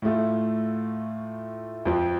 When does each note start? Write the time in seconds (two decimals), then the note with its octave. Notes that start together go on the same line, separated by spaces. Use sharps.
0.02 A2 A3 F4
1.86 F2 F3 C4